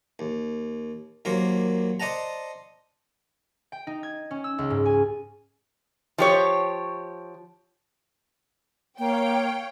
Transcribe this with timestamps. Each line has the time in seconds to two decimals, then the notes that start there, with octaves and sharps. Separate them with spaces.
0.19 D#2
1.25 D#2 F#3 A#3 A#4 C5
2.00 C5 D5 D#5 F#5 A5 A#5
3.72 G5
3.87 D#4
4.03 G#6
4.31 C#4
4.44 E6
4.58 C#2
4.70 G#2
4.86 G#5
6.18 F3 G4 C#5
8.99 A#3 C#5 F5 G5